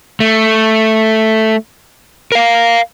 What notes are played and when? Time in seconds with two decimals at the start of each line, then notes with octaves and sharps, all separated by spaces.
0.20 A3
2.32 A#4 F5